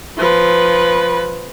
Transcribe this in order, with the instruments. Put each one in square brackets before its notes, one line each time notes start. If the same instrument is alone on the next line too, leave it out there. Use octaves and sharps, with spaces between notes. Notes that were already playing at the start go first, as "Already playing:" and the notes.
[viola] F3 B4